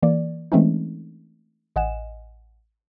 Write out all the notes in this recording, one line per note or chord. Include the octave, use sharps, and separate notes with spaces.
E3 A#3 D5
E3 G#3 A3 C4 C#4 D#4
A1 D#5 F#5 G#5 E7